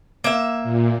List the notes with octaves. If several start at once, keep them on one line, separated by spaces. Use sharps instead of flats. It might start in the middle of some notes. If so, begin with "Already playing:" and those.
A#3 E5
A#2